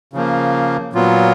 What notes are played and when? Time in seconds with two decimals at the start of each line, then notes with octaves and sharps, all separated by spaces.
0.13 C#3 F3 A#3
0.93 A#2 F#3 B3 F4